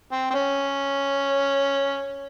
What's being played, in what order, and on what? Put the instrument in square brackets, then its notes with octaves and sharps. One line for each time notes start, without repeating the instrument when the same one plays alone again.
[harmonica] C4
C4
C#4